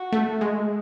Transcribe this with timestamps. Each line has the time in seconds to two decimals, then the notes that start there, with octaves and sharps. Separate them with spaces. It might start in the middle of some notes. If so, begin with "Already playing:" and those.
Already playing: F#4
0.12 A3
0.41 G#3